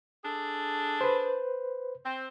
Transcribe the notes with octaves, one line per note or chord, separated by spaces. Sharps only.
D4 G#4 A4
B4 C5
C4